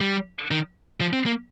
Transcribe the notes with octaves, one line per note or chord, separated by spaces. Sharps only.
G3
D#3
F3
C4
A#3